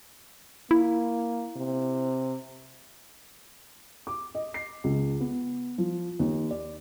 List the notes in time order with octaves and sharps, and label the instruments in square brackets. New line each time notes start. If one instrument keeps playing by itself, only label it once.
[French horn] A#3 [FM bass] E4
[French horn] C3
[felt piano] D6
D#5
C7
C#2
B3
F3
D#2
D5